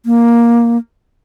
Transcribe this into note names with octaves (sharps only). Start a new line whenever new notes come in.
A#3